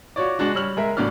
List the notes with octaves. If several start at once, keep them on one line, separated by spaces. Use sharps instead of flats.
F4 F#4 C#5 D5
G#3 D4 F#4
G3 C#5 E6 F6 F#7
G#3 A#4 E5
A1 A2 F#3 D4 D5 F6